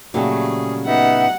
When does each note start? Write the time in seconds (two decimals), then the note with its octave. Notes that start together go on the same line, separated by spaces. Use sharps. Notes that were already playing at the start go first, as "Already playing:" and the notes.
0.14 A#2 C#3 F#3 G3 A3 G#4 A4
0.86 B3 D#4 E5 F#5